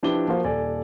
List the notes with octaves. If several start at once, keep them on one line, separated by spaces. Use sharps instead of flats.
F3 D4 E4 G4 B4 G7
F3 A#3 F#4 C5 F5
D#1 A4 D5 G#5